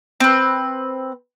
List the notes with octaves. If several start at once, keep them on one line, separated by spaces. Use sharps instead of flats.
C4 B4